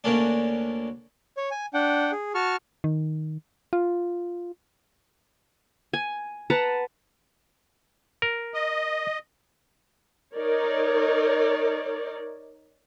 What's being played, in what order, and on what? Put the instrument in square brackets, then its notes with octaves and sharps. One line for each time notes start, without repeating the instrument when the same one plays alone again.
[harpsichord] D2 A#3 C#4 D4
[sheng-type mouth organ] C#5
G#5
D4 F#5 G5
G#4
F#4 A5 C#6 F6
[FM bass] D#3
F4
[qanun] G#5
B4 F#5 A5 A#5
[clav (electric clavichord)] A#4
[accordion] D#5
[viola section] D#4 A#4 C#5 D5